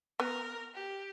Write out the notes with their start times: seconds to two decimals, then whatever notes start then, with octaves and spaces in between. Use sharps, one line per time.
0.20 B3 A#4
0.75 G4